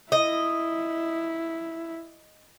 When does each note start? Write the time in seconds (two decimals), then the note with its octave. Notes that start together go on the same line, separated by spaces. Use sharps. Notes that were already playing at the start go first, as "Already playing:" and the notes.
0.12 E4 D#5